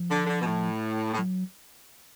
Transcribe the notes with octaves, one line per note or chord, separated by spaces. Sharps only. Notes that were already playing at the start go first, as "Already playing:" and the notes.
Already playing: F3
D3
D3
B2
A2
A2
F#3